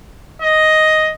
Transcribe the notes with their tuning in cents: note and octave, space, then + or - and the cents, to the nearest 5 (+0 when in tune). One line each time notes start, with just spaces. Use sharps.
D#5 +5